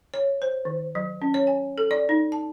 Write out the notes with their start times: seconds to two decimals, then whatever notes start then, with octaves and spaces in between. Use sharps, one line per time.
0.14 C#5
0.42 C5
0.65 D#3
0.95 F#3
1.22 C#4
1.34 C#5
1.47 G#5
1.78 A4
1.91 D5
2.09 D#4
2.32 A5